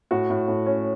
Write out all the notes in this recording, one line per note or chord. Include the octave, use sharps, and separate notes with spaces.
A2 F#4
A2
A2
C#4